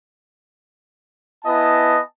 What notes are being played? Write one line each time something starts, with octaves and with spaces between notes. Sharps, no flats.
B3 E4 D#5 G#5 A5